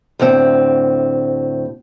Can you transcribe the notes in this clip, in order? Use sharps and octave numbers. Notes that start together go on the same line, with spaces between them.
D2 A2 C4